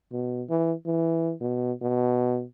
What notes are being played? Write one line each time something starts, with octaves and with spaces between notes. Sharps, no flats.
B2
E3
E3
B2
B2